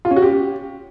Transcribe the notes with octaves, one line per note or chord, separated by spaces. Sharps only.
F4
C#4
F#4
G4